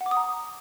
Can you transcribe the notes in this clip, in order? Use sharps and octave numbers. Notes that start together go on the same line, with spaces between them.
F#5
D6
D#6
A#5